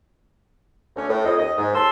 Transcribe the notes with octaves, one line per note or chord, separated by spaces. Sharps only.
D2 C#4
A2
F2 D#5
D#2 D#5
G#2
D#2 A5 C6 E6